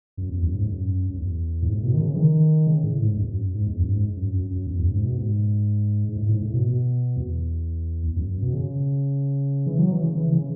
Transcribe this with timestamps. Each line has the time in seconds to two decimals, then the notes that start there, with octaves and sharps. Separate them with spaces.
0.17 F#2
0.29 E2
0.43 F#2
0.55 G#2
0.67 F#2
1.10 F#2
1.17 E2
1.62 A2
1.67 G#2
1.77 A2
1.83 B2
1.93 D#3
2.00 C#3
2.13 E3
2.17 D#3
2.67 C#3
2.84 A2
3.00 G#2
3.17 F#2
3.29 F#2
3.55 G#2
3.67 E2
3.79 F#2
3.92 G#2
4.17 F#2
4.34 F#2
4.50 F#2
4.67 E2
4.79 F#2
4.92 G#2
5.04 B2
5.17 G#2
6.09 G#2
6.17 A2
6.29 G#2
6.42 A2
6.54 B2
6.66 B2
7.16 E2
8.07 E2
8.16 F#2
8.29 F#2
8.42 B2
8.54 C#3
9.67 E3
9.78 F#3
9.91 E3
10.04 C#3
10.16 E3
10.32 C#3